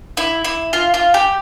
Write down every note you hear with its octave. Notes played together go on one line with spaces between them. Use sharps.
E4
E4
F4
F4
G4